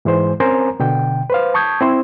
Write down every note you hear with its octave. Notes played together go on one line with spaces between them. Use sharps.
G#2 E3 G#3 C5
C4 C#4 A#4 C5 G#5 A#5
B2 D3 G5
B4 C5 F5
A5 C#6 D#6 G6 G#6
C4 E4 C5